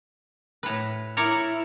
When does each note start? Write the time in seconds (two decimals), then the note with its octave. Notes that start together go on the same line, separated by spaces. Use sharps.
0.63 A2 B4
1.17 E4 A#4 C#5 D5